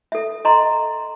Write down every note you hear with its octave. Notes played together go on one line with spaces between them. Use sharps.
A4 E5
D#5 A#5 C6